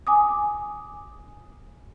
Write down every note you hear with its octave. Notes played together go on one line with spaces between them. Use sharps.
G#5 D6 D#6